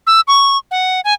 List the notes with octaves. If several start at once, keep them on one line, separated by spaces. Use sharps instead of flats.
E6
C#6
F#5
G#5